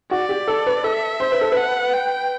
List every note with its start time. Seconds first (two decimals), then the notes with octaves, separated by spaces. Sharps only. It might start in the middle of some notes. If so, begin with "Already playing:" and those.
0.11 F#4 D5
0.29 G4
0.48 A4
0.67 B4
0.84 A4 E5
1.20 C5
1.32 B4
1.41 A4
1.52 B4
1.57 F#5
1.94 G5